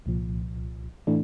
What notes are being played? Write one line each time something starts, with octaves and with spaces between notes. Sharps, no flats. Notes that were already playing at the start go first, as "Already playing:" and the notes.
C2 A#2 F3
A2 E3 A3 D4